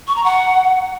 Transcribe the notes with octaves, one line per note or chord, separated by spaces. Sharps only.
C#6
A#5
F#5